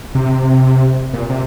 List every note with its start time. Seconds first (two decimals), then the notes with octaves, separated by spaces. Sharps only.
0.15 C3
1.13 A#2
1.30 C3